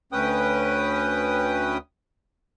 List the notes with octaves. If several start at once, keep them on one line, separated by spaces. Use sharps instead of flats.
D2 C#4 B4 G5 D#6